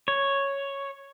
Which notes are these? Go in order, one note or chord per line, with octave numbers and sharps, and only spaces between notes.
C#5